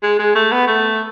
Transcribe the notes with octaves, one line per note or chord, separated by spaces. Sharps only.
G#3
G#3
A3
B3
A3